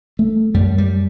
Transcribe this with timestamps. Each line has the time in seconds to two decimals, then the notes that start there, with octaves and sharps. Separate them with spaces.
0.19 A3
0.54 F#2 G3
0.78 G3